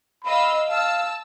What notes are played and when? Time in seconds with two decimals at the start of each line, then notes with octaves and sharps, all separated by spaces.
0.24 D#5 F5 B5 E6
0.69 F5 A5 E6